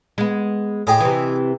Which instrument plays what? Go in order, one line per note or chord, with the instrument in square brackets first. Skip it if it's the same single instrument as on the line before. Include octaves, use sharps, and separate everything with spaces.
[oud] G#3 B3
[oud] A2 [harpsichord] G4 G#4 D#5
[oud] C3 E3